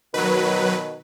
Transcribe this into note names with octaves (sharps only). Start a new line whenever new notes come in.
B2 D#3 F#3 B4